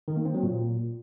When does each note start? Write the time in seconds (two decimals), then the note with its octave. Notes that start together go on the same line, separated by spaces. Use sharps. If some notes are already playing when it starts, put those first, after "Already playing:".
0.08 D#3
0.17 A#3
0.25 C4
0.34 F#3
0.43 A#2